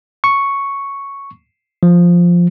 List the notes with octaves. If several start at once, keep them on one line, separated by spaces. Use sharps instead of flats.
C#6
F3